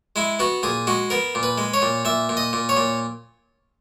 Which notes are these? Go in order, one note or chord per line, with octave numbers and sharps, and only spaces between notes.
G#3 E4
B3 F#4
A#2 G#4
G#3 F#4
B3 A#4
A#2
B4
G#3
C#5
A#2
A#2 E5
A#2
D#5
A#2
C#5
A#2